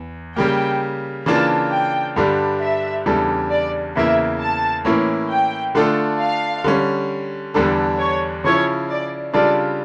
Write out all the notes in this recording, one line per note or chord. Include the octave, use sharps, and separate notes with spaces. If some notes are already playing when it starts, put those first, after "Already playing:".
Already playing: E2
C#3 G3 A#3 G5
C#3 E3 A#3 D4 F4 A5
G5
G2 D3 G3 D4
E5
E2 C#3 G3 D4 A4
D5
E2 C#3 E3 A#3 E4 E5
A5
A2 E3 A#3 C#4 E4
G5
D3 A3 D4 F4 A4
F5
D3 G3 C#4
E2 D3 G3 D4 A4
C#5
C#3 F3 C#4 E4 C#5
D5
C#3 G3 D4 F4 A4 D5